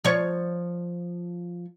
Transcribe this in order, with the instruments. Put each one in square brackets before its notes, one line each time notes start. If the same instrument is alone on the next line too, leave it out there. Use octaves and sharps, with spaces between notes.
[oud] F3 C#5